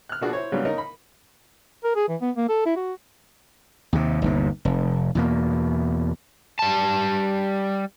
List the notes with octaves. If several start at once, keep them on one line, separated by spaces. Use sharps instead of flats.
F6 F#6
B2 F3 D4 F#4 G#4
E4 C5 C#5
G#2 C#3 F#3 G3 B3 D4
C#4 D#4 A#4 D#5
B5
A#4
G#4
E3
B3
A#3
A4
E4
F#4
D#2 C3
G1 D#2 C3
F1
E2 B2 A#3
G3 A5